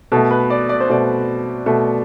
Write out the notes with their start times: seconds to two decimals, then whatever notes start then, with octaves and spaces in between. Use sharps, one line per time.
0.12 B2 A3 A4
0.31 B4
0.50 D5
0.69 D5
0.80 C5
0.89 B2 A3 D5
1.66 B2 A3